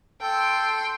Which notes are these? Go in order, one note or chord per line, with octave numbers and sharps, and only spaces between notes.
A4 G5 C6